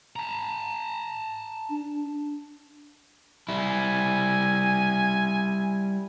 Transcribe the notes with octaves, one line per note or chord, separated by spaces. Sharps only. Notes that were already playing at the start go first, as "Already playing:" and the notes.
A5 A#5
D4
G3 E4 G#5